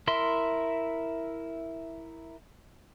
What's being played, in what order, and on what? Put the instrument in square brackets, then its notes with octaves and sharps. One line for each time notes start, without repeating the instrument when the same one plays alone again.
[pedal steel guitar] E4 A#4 E5 C6